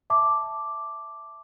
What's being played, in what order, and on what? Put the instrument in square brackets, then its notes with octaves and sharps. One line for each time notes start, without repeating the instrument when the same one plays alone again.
[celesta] E5 A5 D6